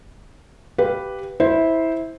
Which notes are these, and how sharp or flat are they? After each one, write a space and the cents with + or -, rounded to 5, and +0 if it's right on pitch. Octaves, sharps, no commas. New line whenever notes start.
G4 -5 B4 +0 F5 +0
E4 -15 C5 +0